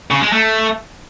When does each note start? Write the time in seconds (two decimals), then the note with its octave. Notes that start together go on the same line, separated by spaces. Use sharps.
0.11 C#3
0.22 G#3
0.32 A3